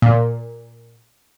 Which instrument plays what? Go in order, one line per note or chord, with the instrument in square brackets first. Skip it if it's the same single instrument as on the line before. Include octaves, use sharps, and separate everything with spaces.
[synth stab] A#2